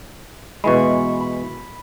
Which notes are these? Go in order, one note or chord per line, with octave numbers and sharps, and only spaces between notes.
B2 E3 G#3 B5 C#6
B5